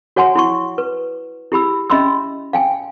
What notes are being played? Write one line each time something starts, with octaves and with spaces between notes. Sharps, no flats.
F#4 C#5 F#5 G#5 C6
E4 C6 C#6
B4
E4 G4 B5 E6
C#4 D#5 E5 B5 C6 E6
F5 G5 G#5